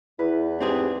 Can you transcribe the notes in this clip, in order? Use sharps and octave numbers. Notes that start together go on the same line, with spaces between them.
E2 E4 B4
G#2 C4 G4 G#4